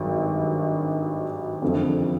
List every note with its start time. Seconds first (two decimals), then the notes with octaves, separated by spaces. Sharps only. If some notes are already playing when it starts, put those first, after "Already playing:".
Already playing: G#1 G2 D#3 F#3
1.62 F#1 F2 D3 G3 C4